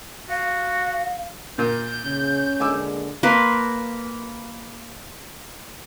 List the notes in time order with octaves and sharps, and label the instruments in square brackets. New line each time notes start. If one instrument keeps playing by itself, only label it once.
[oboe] F#4 [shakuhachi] F5
[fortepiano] A#2 A#3 [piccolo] G6
[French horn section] C#3 [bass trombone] C#4
[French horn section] A#2 D3 G#3 [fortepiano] G#5 D6 E6
[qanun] A#3 B4 C6